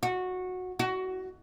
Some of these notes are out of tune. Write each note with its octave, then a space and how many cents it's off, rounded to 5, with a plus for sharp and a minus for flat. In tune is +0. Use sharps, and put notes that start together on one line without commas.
F#4 -15
F#4 +15